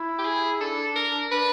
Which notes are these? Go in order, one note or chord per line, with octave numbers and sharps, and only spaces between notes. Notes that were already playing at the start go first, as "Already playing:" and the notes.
Already playing: E4
G4
G#4
D4 A4
A#4
D4 B4